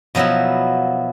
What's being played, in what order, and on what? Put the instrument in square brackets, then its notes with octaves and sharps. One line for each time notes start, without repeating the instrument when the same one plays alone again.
[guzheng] B2 F3 F#3 B3 E4